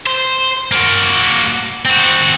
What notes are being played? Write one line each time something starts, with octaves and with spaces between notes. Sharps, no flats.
C5
A#3 F#4
C4 F#4